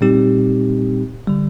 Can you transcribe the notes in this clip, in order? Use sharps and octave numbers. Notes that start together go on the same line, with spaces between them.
A#2 G3 C4 D#4 G4
D3 G3